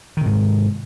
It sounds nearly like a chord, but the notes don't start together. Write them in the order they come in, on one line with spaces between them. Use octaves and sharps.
D#3 C3 G#2